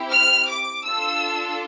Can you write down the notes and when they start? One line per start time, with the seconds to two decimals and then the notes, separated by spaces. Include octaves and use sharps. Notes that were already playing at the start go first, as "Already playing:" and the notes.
Already playing: C4 E4 G4
0.12 F6
0.49 D6
0.84 D4 F4 A4 E6